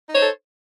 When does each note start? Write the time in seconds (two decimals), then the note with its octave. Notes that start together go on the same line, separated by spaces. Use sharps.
0.10 D#4
0.13 C#5
0.17 C5
0.21 A4